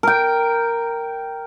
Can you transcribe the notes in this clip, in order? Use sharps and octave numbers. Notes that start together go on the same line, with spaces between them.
A#4 G5